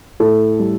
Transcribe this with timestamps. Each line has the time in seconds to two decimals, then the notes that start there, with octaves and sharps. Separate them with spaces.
0.20 A2 A4
0.59 G3